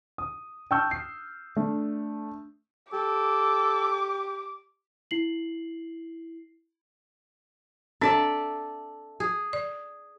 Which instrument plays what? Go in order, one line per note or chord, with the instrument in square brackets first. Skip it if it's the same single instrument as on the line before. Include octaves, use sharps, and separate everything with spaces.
[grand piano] D#6
G5 A5 C#6 E6 F6 G6
C7
A3 D4
[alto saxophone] G4 [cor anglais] A4 [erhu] D6
[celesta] E4 C7 F#7
[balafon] C4 D4 [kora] A4 D5 E5
[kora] G#4
[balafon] D5